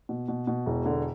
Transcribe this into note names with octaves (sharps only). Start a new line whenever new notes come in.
B2
B2
B2
E1
D3